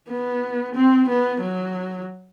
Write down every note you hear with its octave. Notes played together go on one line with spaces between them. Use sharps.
B3
C4
B3
F#3